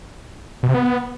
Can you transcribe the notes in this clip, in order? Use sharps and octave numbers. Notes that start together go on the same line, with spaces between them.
B2
C3
B3